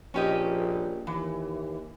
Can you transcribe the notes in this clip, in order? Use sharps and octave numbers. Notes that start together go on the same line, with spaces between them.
A#1 C#4 G4 D#5
D#2 E3